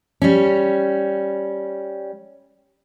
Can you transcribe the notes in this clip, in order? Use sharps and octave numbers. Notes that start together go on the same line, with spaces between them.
G3 C#4